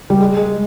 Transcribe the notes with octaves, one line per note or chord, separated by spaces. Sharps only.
G3
G#3
G#3